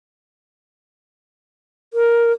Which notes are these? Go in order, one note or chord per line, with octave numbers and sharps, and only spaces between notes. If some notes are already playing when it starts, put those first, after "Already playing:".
A#4